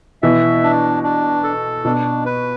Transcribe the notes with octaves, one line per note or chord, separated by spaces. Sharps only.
B2 E3 E5
D4
D4
A4
B2 D4
B4